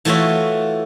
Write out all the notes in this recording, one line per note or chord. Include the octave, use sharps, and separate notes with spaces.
E3 A3 F4 F#4 C#5 E5